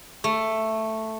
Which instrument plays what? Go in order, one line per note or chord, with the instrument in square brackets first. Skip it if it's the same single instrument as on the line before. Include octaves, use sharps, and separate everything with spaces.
[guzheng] A3